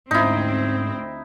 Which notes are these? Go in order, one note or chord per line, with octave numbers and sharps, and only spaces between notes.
D2 G#2 C4 C#4 D#4 E4